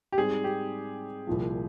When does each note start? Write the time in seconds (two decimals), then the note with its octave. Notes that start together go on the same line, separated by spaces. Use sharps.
0.12 G4
0.18 G#2 G3 C4 G#4
0.44 G4
1.27 C2 A#2 F3